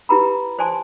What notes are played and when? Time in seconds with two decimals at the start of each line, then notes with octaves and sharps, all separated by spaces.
0.09 E4 G4 B4 A#5 B5
0.59 C5 D5 G#5 A5 C6